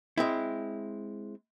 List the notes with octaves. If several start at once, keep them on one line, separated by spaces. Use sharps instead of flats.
G#3 C4 E4